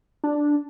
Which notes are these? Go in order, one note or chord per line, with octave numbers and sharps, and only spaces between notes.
D4